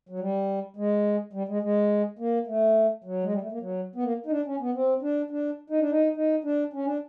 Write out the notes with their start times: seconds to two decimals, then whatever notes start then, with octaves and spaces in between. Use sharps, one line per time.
0.09 F#3
0.20 G3
0.76 G#3
1.33 G3
1.48 G#3
1.63 G#3
2.19 A#3
2.47 A3
3.04 F#3
3.24 G#3
3.33 G3
3.41 A3
3.52 A#3
3.61 F#3
3.95 B3
4.03 A#3
4.26 D#4
4.31 D4
4.46 C#4
4.60 B3
4.74 C4
5.02 D4
5.31 D4
5.70 D#4
5.80 D4
5.90 D#4
6.16 D#4
6.44 D4
6.73 C#4
6.85 D4